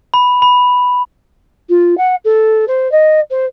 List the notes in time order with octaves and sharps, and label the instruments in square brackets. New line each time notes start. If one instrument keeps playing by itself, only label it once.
[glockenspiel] B5
B5
[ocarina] F4
F#5
A4
C5
D#5
C5